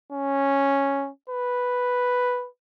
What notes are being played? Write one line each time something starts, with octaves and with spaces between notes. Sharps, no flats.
C#4
B4